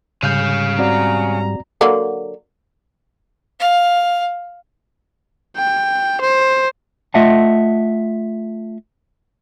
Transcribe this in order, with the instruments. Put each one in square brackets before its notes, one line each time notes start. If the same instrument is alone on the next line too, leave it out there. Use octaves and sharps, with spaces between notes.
[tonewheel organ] G#2 G3 [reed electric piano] C#3 G6 [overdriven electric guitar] C#4 F5
[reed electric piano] C4 F#4 D5 [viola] A#5
[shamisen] D3 F#3 A#3
[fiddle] F5
[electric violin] G5
C5
[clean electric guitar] A3 F4 D#5 E5 F#5 A5